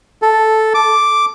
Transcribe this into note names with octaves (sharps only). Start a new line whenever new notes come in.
A4
D6